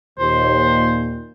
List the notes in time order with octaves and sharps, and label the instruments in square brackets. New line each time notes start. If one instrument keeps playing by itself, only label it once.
[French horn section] D#2 A#2 [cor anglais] C5